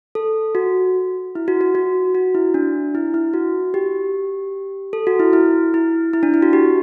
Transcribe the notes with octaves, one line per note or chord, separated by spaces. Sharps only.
A4
F#4
E4
F#4
F#4
F#4
F#4
E4
D4
E4
E4
F#4
G4
A4
F#4
E4
E4
E4
E4
D4
E4
F#4
G4